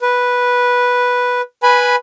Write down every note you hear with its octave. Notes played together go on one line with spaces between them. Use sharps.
B4
B4 G#5 B5